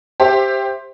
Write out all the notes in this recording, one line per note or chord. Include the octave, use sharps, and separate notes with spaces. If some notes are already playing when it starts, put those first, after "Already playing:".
G4 C5 E5